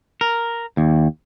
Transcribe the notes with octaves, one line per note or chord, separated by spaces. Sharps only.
A#4
D#2